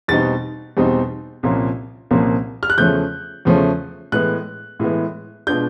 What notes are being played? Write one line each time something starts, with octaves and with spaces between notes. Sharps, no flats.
E2 B2 G3 C4 D#4 A6
E2 B2 G3 C4 D#4
C2 A#2 F3 A#3 C#4
C2 A#2 F3 A#3 C#4
F6
F#6
E2 C#3 F3 A3 C#4 G6
E2 C#3 F3 A3 C#4
A2 E3 G#3 B3 F#6
A2 E3 G#3 B3
B2 G#3 B3 D4 F4 G6